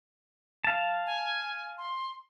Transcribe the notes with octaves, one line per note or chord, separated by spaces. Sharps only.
F5 A5
G#5
C6